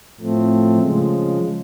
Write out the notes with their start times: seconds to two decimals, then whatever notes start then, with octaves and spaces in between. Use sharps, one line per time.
0.20 A2 F3 A3 C4
0.79 C#3 F3 G#3